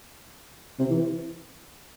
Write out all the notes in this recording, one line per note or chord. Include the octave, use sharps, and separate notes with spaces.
C3
E3